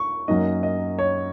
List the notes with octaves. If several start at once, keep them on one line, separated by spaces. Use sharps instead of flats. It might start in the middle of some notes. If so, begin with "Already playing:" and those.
Already playing: C#6
F#2 F#3 A#3 D#4 D#5
D#5
C#5